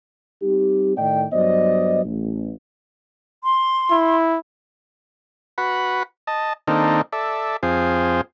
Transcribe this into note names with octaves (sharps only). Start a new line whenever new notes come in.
G3 C4 D#4 G4
A2 D#3 D5 D#5 G5
G2 F#3 B3 C5 D5 D#5
A1
C6
E4
F#4 B4 F#5 B5
D#5 A5
D#3 A#3 C4 D4 D#4 A4
A4 D5 E5
F2 C4 F4 G#4 C5